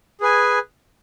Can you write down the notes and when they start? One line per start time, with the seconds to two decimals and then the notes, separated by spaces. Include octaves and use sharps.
0.21 G#4 B4 G#5